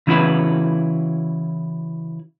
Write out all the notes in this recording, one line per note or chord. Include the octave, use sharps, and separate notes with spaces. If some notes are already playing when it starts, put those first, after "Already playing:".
C#3 E3 C#4 E4 F#4 B4